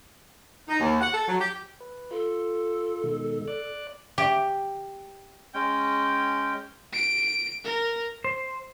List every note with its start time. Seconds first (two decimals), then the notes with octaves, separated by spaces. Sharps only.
0.68 D#4
0.80 D#2
1.01 F#5
1.14 A4
1.28 F#3
1.40 G4
1.80 B4
2.11 F4 A4
3.04 B2 D#3 G#3
3.48 D5 D6 F#6
4.18 G4
5.54 G#3 C#4 G5
6.93 D7
7.64 A#4
8.24 C5